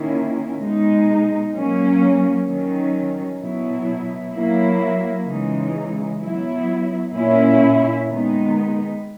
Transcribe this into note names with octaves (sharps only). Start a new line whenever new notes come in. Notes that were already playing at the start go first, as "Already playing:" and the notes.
Already playing: D#3 A#3 C#4 E4
B2 G#3 D#4
F#3 A#3 C#4
D#3 F#3 C#4
B2 F#3 B3 E4
F#3 A#3 E4
C#3 E3 G#3 D#4
F#3 B3 E4
A#2 A#3 C#4 E4
D#3 G#3 B3 D#4